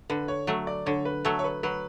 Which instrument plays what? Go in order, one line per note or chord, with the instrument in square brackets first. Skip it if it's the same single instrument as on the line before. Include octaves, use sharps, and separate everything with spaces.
[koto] D3 [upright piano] B4
[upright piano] C#5
[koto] F#3 A3
[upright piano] D5
[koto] D3 [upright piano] C#5
[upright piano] B4
[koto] F#3 A3 [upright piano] A4
[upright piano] C#5
B4
[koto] F#3 [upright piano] B4